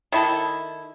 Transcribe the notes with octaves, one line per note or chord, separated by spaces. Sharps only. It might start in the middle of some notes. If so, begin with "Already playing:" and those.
D#3 E4 A4